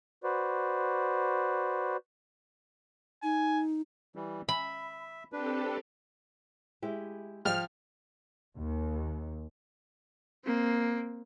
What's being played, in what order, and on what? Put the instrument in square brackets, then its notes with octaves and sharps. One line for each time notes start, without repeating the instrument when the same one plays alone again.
[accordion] F#4 B4 C5 D5
[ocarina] D#4 [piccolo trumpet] G#5
[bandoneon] E3 G3
[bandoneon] E5 [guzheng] B5
[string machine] C4 G4 A4 [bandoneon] D4 B4
[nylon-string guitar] G#3 E4 G4
[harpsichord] G#2 G3 [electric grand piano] F3 F5 G5 [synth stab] F6
[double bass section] D#2
[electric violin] A#3 C4